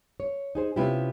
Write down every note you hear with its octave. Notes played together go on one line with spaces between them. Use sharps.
C#5
D#4 G#4 C5
C3 B3 C#4 E4 F4 G4